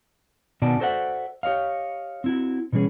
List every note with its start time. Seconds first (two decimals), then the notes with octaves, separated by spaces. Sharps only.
0.62 B2 D#3 F#4 D5 G#5 A5
0.80 F#4 A4 C5 D5 E5 F#5
1.43 G4 C#5 D#5 F5
2.24 C4 E4 F#4
2.73 B2 E3 G3 C#4 G#4